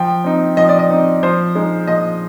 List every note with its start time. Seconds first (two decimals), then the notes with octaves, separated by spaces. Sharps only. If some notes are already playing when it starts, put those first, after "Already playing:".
Already playing: F3 G5
0.24 C4 D#4
0.57 F3 D#5
0.69 D5
0.79 D#5
0.90 C4 D#4
1.23 F3 C5
1.55 G#3 D#4
1.87 F3 D#5